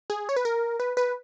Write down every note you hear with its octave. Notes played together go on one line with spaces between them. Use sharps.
G#4
C#5
B4
A#4
B4
B4